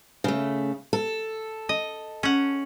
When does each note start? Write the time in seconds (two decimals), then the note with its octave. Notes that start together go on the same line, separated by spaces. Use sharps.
0.24 C#3 A3
0.93 A4
1.69 D#5
2.23 C#4 F#5